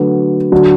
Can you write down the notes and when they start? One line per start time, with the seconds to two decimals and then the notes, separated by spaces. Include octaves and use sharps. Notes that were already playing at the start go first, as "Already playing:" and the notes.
Already playing: D3 F#3 A3 F#4 B4
0.52 D3 F#3 D4 F#4